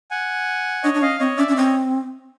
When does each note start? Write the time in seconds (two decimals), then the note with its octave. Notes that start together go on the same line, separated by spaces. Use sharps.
0.11 F#5 G#5
0.83 D4 C#5 D#5
0.94 D4
1.02 C#4 D#5 F5
1.20 C4 C#5 D#5
1.37 C#4 D5 E5
1.48 C#4 D5
1.56 C4 C#5 D#5